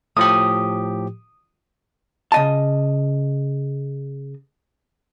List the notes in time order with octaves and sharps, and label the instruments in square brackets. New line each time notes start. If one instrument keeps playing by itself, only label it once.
[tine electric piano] A2 F3 G4 [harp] D#6
[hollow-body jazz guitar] C#3 D#5 A5